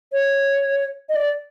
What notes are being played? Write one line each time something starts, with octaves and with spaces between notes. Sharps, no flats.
C#5
D#5
D5